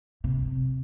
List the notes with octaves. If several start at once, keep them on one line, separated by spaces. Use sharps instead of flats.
C3